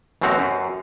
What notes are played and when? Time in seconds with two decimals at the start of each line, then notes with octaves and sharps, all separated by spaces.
0.21 A1 F#2 B2 C4 F#4 A#5
0.39 F#2